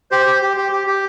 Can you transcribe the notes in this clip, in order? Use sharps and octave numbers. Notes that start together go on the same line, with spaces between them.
G4 C5
G4
G4
G4
G4
G4